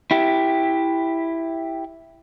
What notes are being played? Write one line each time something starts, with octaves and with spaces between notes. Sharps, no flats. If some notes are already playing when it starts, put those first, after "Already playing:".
E4 G4